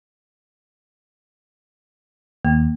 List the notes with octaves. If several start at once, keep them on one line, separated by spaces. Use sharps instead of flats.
D#2 A#3